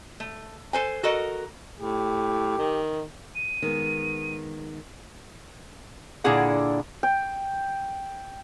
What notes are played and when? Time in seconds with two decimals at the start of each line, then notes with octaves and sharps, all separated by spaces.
0.20 A3
0.73 A4 C5 G#5
1.03 F#4 A4 A#4 D#5
1.80 A2 G4
2.58 D#3
3.35 D#7
3.62 D#3 G#3 B3
6.24 A#2 D3 D4 E4 G#4 F#5
7.03 G5